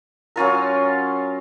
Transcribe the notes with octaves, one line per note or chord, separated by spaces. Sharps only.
F#3 C#4 F4 A#4